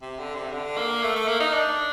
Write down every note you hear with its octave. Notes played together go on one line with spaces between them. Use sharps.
C3
D3
C3
D3
A#3
A3
A3
A#3
D#4
D4